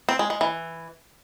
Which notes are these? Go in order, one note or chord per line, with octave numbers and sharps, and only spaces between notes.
C4
G#3
G#3
E3